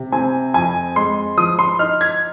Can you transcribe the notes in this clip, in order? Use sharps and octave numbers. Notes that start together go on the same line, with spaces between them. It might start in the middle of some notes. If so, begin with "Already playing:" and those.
Already playing: C3
C4 G#5
F2 G#5
G#3 C6
F3 D#6
C6
D#4 F6
G#6